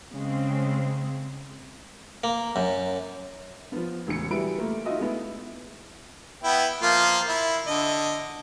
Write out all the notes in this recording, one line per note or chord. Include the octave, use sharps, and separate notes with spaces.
C#3 G#3 C4
A#3
F#2
F3 B3
E1 A1 C#3 C#7
F#3 G3 E4 G#4 B4 D7
A3 A#3 F4
D#4 F4 F#4 D#5 E5
G#3 A3 B3 E4
B3 E4 G5
F3 A#3 F4
E4
D3 D#5